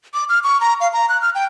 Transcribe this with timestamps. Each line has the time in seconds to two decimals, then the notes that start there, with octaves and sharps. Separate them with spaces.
0.14 D6
0.29 F6
0.44 C#6
0.61 A#5
0.80 F5
0.93 A#5
1.09 F#6
1.22 F6
1.35 G5